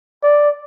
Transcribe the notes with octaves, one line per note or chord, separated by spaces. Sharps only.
D5